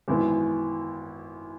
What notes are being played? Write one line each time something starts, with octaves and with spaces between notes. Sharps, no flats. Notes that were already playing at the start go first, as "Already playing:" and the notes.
G#1 F#2 E3 B3 E4